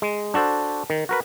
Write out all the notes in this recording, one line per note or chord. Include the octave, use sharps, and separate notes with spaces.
G#3
D4 F#4 A4 C5
D#3
F#4 A#4 B4